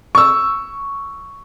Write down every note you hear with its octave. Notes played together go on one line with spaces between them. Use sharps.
C#6 E6